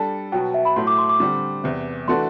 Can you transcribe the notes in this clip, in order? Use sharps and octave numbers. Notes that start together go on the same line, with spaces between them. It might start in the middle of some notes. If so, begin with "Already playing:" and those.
Already playing: G3 D4 A4 A5
B2 F#3 B3 F#4 G5
E5
B5
A2 F#3 A3 C6
D6
C6
D6
D3 G3 C4
E2 C3 E3
E3 A3 D4 F#4 A4 C6